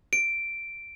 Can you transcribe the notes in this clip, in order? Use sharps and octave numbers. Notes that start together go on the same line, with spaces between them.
D7